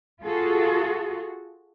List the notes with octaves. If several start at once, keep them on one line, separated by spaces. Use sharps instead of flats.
F4 F#4 G#4 A4